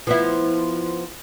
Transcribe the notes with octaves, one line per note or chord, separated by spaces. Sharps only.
F3 B3 E4